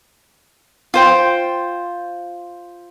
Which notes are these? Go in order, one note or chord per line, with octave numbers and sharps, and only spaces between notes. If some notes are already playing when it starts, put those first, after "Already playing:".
F4 C5 G5